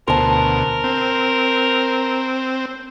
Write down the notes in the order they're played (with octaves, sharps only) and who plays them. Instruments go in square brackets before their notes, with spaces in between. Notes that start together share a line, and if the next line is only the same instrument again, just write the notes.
[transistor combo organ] D2 B2 [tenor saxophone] A#4 [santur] C5 A5
[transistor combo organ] C4